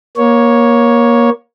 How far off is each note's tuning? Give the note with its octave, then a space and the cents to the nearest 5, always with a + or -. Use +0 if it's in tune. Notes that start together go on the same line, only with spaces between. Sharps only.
A#3 +25 C#5 +0